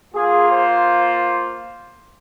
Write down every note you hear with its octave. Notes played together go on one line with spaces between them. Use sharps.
A#3 F4 G#4
C5